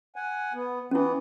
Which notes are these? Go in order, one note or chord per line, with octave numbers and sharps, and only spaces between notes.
F#5 G#5
B3
E3 B3 C#4 E4